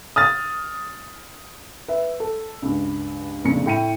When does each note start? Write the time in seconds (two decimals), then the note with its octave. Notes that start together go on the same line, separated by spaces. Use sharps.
0.16 D#6 F6 A6
1.88 B4 E5
2.20 A4
2.62 C#2 G2
3.44 F1 A#1 C#3 C#7
3.66 A2 G5 C#7 D#7